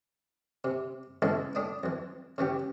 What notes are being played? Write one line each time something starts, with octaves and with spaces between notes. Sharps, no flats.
C3
C#3 E3 G#3 A3 E4 A4
A2 D4 D#6
F2 E3
C#3 E3 C#4 G4